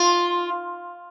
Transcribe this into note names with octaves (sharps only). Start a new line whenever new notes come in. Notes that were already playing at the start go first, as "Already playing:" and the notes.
Already playing: F4